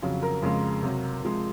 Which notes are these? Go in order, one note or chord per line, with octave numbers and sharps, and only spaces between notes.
F2 C#3 F#3
A#4
F2 C#3 G#3
C3 F#3
C3 F3 G#3